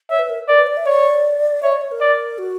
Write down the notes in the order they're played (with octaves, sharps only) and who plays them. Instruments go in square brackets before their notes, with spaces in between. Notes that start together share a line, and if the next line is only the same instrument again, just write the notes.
[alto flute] C#5 [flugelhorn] E5
[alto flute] B4
A#4
[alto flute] A#4 [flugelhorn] D5
[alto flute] B4
D5
E5
[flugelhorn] C#5 [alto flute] D5
[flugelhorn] C#5 [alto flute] E5
[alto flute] D5
C#5
A#4
[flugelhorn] D5
[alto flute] F#4